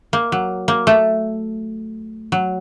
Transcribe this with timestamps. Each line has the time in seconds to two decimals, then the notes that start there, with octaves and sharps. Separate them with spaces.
0.13 A#3
0.32 F#3
0.68 A#3
0.87 A3
2.32 F#3